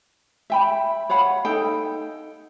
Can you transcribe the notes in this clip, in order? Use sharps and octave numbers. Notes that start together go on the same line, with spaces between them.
E5 G5 B5
C#5 F5 F#5 B5
D#4 A4 G5